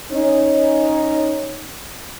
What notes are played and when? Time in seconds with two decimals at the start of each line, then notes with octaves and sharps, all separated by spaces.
0.12 C#4 D#4